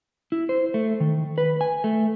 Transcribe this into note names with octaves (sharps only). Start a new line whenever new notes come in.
E4
C5
A3
D#3
B4
G#5
A3